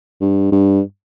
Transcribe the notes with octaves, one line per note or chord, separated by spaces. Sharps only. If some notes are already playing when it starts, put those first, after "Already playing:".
G2
G2